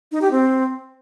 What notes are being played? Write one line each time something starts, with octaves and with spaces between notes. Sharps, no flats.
D#4
G4
C4